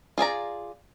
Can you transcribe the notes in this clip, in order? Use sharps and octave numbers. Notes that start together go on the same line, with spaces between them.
F4 G#4 D5 A#5